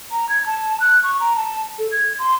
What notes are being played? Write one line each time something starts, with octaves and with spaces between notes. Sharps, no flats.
A#5
G#6
A5
F#6
C#6
A#5
A5
A4
G#6
C6